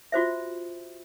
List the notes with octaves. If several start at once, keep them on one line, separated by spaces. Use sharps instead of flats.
F4 F#4 C5 E5